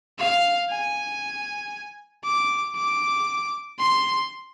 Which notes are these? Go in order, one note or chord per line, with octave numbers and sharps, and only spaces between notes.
F5
G#5
D6
D6
C6